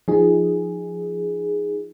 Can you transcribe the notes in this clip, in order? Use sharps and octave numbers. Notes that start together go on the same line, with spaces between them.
F3 D#4 G#4